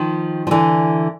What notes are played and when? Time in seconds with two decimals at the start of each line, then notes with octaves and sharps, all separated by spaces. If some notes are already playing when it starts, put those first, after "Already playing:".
Already playing: D#3 F3
0.47 F3
0.51 D3 E3